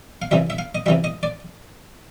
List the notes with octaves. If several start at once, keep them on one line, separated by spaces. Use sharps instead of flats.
F5
C3 E3 G3 E5
E5
F5
D#5
C3 E3 G3 E5
D#5
D5